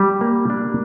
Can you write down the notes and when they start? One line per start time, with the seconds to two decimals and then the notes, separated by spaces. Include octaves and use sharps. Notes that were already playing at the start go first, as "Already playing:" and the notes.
Already playing: G3
0.21 A#3
0.50 D4